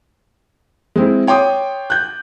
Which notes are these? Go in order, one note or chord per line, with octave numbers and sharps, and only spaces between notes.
G#3 C4 E4
C#5 G5 C6 D6 D#6
F#6 G6